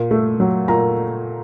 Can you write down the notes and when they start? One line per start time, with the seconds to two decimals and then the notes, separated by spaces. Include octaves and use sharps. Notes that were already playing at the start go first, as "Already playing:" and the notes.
Already playing: A#2
0.11 A3
0.40 F#3
0.68 A#2 A#5